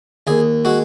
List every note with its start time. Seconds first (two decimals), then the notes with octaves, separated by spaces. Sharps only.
0.27 D#2 G#4
0.65 G#3 F#4